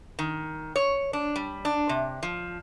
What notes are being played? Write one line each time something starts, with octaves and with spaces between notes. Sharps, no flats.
D#3
C#5
D4
G3
D4
C3
F3